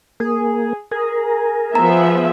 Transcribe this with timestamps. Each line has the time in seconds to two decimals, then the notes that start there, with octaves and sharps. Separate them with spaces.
0.20 A#3 G#4
0.91 G#4 A#4
1.75 F3 B3 E5 A#5